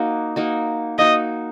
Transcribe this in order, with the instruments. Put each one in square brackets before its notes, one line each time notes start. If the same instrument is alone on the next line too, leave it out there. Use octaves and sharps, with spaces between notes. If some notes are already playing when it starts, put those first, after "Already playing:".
Already playing: [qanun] A#3 D#4 F#4
A#3 D#4 F#4
[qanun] A#3 D#4 F#4 [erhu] D#5